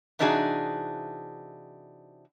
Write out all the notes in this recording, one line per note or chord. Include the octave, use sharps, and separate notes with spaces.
C3 E3 D4 D#4 F#4 G#4